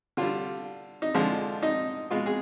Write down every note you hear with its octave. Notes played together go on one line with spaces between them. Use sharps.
D3 G3 F4
D#4
D3 F3 G#3 F4
D#4
B2 G#3 F4
G#4